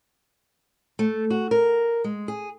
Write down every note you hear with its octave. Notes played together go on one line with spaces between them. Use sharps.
A3
F#4
A#4
G#3
G#4